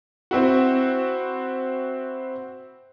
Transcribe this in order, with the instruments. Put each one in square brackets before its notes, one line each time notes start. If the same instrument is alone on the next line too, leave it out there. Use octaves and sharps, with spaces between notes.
[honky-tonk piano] C4 E4 F#4